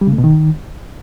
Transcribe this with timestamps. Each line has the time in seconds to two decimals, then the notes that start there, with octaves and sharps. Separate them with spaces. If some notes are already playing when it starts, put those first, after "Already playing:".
0.01 G3
0.07 C#3
0.13 A3
0.18 B2
0.24 D#3